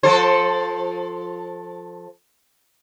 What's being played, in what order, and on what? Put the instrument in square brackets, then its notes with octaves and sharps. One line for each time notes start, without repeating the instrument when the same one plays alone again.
[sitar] F3 A4 C5